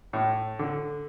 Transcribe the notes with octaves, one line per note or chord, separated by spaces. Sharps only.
A2
D3